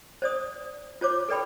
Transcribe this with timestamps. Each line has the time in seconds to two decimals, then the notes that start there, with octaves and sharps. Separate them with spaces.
0.22 C5 D5 D#6
1.01 F4 C5 C#5 D6
1.29 A4 B4 D5 G5 B5